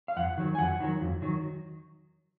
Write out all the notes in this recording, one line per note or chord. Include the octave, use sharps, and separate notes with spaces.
F5
F2 F#5
D#3 F#3
G#5
F2 F#5
D#3 F#3
F2
D#3 F#3